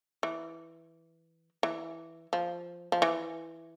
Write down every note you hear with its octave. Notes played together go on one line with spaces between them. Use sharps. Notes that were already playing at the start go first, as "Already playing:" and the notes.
E3
E3
F3
F3
E3